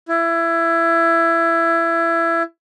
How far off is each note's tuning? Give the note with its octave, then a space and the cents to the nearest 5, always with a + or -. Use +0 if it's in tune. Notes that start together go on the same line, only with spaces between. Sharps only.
E4 +20